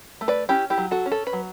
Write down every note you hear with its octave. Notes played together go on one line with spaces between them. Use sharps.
A3
B4 D5
C#4 E4 G4
E4 G4
F#3
F#4 A4
C#4
A4
B4
F#3